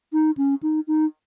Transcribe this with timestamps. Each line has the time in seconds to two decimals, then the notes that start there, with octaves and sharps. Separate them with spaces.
0.13 D#4
0.37 C#4
0.63 D#4
0.87 D#4